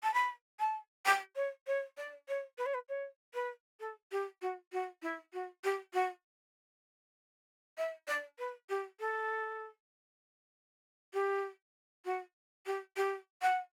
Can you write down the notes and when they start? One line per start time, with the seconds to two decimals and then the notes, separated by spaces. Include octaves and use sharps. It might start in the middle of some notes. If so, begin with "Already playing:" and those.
0.03 A5
0.13 B5
0.59 A5
1.05 G5
1.35 C#5
1.67 C#5
1.97 D5
2.28 C#5
2.58 B4
2.66 C#5
2.74 B4
2.88 C#5
3.34 B4
3.80 A4
4.11 G4
4.41 F#4
4.72 F#4
5.02 E4
5.33 F#4
5.64 G4
5.93 F#4
7.77 E5
8.07 D5
8.38 B4
8.69 G4
8.99 A4
11.13 G4
12.05 F#4
12.66 G4
12.96 G4
13.42 F#5